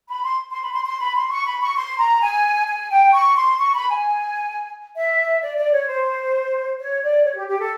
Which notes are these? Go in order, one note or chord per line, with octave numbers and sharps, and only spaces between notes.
B5
C6
C6
B5
C6
C6
B5
C6
C#6
B5
C#6
C6
A#5
G#5
G#5
G5
C#6
C6
C#6
B5
G#5
E5
D5
D5
C#5
C5
C#5
D5
C#5
G4
G4
A4